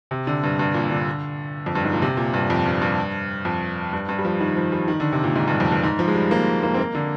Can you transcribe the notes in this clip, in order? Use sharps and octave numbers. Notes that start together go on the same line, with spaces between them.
C3
D3
G2
G2
A#2
D3
F2
G2
G#2
A#2
C3
A#2
G2
F2
G2
G2
F2
G2
G2
G3
F3
D#3
F3
G3
D#3
D3
C3
A#2
G#2
G2
F2
G2
G#2
F3
G#3
G3
A#3
A#3
C4
A#3
D3